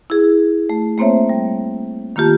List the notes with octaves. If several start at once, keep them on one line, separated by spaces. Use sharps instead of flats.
E4 G#4
A3
A3 A#3 C4 C5 C#5 E5
G3
D#3 A#3 F4 G4 A5